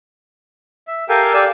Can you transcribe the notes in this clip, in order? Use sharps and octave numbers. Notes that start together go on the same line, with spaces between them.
E5
G4 A4 A#4 F5 G5 G#5
G4 D5 F5 G#5 E6